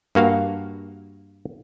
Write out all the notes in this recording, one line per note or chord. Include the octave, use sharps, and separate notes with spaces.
G2 A#3 F#4 F5